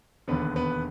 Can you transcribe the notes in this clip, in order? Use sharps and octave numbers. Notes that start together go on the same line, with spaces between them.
E1 D#2 D3 B3 B4
B3 B4